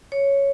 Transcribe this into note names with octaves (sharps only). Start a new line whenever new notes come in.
C#5